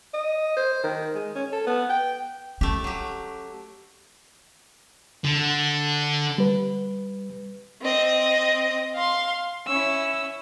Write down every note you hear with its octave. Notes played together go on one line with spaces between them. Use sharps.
D#5
C5
D#3
G#3
C#4
A4
B3
G5
A3 C#4 G4
F#3 G4
D3
G3 B4
C4 D#5
F5 C6
C#4 E4 E6